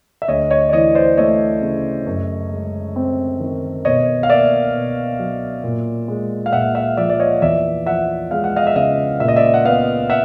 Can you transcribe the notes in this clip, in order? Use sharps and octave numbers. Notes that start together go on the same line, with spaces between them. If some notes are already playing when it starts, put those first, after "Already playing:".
E5
D2 C#5 D#5
C#5 D#5
D5
E3 C#5 D#5
C5 D5
A3 C#5 D#5
C#3
F#2
G#3
C4
D#3
B2 C#5 D#5
F5
A#3 D5 E5
B2
F#3
A#2
G#3
F5
A#2 E5 F#5
E5 F#5
F3 D5 E5
D5
C#5 D#5
E2 D5 E5
F3 E5 F#5
G#3 F5
F#5
D#5 F5
E5
C#3 D#5 F5
A#2 E5
D#5
D5 E5
F#5
B3 D#5 F5
E5 F#5